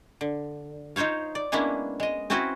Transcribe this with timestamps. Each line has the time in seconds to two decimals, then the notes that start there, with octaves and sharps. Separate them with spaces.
0.21 D3
0.96 D#4 F4 C5 C#5 F5
1.35 D5
1.52 G#3 A#3 B3 C#4 D4 E4
2.00 G#3 D#5
2.30 C4 C#4 E4 F#4 B4 C5